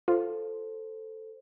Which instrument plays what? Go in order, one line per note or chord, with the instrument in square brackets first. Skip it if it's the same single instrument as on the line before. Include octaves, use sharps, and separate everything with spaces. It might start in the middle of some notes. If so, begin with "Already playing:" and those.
[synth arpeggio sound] F4 [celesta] A4 C5